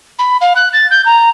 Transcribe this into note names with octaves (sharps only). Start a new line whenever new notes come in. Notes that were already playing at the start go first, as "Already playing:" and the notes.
B5
F5
F#6
A6
G6
A#5